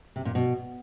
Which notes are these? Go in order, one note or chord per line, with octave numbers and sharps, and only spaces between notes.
C3
A#2
B2